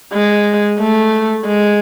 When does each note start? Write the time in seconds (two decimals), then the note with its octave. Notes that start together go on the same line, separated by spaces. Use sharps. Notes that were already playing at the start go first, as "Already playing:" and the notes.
0.13 G#3
0.80 A3
1.47 G#3